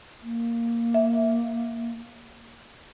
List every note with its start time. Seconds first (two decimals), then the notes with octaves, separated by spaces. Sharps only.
0.22 A#3
0.94 E5